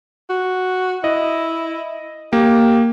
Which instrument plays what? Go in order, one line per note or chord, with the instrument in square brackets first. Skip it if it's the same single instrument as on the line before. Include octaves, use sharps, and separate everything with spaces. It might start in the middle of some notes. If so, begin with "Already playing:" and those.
[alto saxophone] F#4
[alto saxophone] E4 [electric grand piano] D#5
[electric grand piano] A#3 [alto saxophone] G4